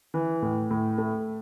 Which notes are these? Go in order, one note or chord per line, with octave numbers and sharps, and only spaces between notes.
E3
A2
A2
A3